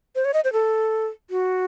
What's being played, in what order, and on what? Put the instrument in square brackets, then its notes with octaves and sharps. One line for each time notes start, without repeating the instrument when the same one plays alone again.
[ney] C5
C#5
D#5
C5
A4
F#4